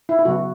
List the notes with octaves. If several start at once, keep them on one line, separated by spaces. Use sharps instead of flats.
E4
E4
C#3 F#3 B3 F#4